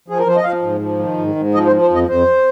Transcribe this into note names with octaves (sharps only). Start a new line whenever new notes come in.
F3 G#4
A#4
F3 C5
D#5
F3 F5
G#2
F3
D#3
G#2
G#2
F3 D#5
C5
F3
C5
F2 D#5
F2 C5